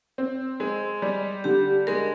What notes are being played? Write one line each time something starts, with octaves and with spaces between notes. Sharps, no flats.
C4
G#3
G3
D3 G4
G#3 A#4